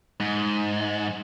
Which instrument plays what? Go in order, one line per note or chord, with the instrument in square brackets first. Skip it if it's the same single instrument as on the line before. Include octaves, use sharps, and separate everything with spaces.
[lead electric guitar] G#2